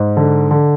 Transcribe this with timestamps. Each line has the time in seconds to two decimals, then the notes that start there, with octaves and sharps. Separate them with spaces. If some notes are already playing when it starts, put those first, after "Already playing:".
Already playing: G#2
0.17 D3
0.51 D3